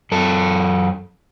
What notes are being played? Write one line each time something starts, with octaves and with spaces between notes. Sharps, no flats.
F#2 A4